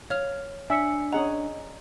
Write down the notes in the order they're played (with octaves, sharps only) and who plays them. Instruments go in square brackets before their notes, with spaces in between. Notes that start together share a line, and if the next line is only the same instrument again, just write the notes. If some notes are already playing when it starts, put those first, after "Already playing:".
[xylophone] C#5 F6 F7 [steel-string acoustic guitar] F5
[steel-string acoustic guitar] D4 [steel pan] E5 [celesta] G#5 E6 C#7
[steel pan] C#4 G#4 F#5 [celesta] D#5 [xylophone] A#5